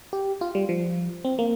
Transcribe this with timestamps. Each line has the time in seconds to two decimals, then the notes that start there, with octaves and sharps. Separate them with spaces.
0.13 G4
0.41 F4
0.55 G3
0.69 F3
1.25 C4
1.39 A#3